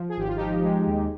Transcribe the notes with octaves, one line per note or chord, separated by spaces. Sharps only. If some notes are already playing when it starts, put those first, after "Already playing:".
Already playing: F3
G#4
G#1 G4
F4
F3 D#4 G4
G#3
D#2